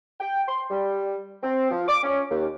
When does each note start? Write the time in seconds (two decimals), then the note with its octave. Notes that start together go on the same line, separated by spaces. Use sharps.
0.20 G5
0.48 C6
0.71 G3
1.43 C4
1.71 F3
1.88 D6
2.04 C#4
2.30 D#2